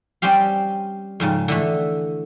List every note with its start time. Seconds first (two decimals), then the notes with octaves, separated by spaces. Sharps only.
0.22 G3 C4 C#4 G4 F5
1.20 F2 G#2 C#3
1.48 D3 E3 A3